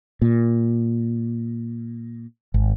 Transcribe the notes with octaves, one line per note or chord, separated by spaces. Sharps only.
A#2
G#1